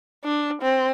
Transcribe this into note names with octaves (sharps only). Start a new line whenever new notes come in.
D4
C4